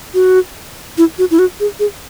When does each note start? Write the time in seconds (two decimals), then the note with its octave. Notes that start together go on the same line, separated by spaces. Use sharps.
0.14 F#4
0.98 E4
1.18 F#4
1.31 E4
1.39 F#4
1.60 G#4
1.80 G#4